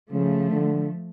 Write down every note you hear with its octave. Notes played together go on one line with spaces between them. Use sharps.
C#3 F3 A3
D3